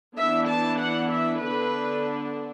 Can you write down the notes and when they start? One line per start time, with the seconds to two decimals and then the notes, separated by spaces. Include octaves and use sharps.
0.17 E3 B3 D4 E5
0.49 A5
0.80 F#5
1.11 E5
1.42 D3 B3 D4 B4